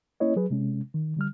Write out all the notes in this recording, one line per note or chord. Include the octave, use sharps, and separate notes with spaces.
A#3 C#4 E4 C#5 D#5
F#3 G#4 B4
C3 G#3 C#4
D#3
D3 G3 F6